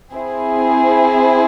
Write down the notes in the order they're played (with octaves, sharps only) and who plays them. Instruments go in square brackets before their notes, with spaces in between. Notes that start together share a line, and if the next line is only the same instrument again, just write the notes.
[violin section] C4 E4 G#4